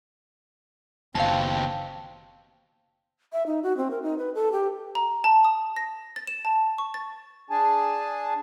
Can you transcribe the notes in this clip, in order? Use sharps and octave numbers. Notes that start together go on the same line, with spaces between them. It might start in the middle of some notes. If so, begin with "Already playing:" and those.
F#1 D#2 B2 C4 F5 A5
E5
D#4
F#4
C4
A#4
D#4
B4
A4
G4
A#5
A5
D#6
A#6
A6
E7
A5
C#6
A6
D4 G#4 G#5 A5